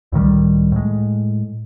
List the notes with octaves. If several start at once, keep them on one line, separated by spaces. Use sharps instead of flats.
C#2 A2 D#3 G3
A2 G#3